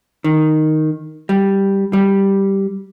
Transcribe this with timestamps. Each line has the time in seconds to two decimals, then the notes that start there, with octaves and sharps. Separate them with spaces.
0.24 D#3
1.29 G3
1.93 G3